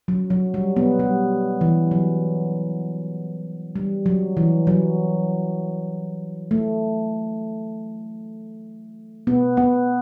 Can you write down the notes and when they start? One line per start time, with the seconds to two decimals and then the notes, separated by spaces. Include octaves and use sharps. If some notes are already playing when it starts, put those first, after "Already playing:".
0.08 F#3
0.30 F#3
0.54 G3
0.76 B3
0.99 G3
1.61 E3
1.91 F#3
3.76 G3
4.06 F#3
4.37 E3
4.67 F#3
6.51 A3
9.27 B3
9.57 B3